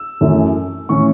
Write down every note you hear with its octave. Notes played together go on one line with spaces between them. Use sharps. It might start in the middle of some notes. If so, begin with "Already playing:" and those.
Already playing: E6
F#2 E3 A3 C#4
A2 E3 C#4 C#6